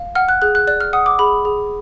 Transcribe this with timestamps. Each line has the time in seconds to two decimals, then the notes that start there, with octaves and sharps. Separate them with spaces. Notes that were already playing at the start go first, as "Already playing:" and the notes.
Already playing: F5
0.15 F#5 F6
0.29 F#6
0.42 G#4 F#6
0.55 F#6
0.67 D5 F#6
0.80 F6
0.93 F#5 D#6
1.06 D6
1.19 G#4 B5
1.45 G#4